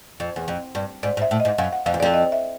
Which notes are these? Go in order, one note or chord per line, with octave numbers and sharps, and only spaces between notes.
F2
E2
F2
G2
G#2 D5
G#2
E5
A2
D#5
G#2
F#2 F5
F#5
F2 F5
E2
F2 D5
D#5
E5